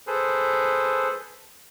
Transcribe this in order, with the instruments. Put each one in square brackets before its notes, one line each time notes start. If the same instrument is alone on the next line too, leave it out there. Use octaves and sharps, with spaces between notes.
[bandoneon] G#4 A4 B4 C5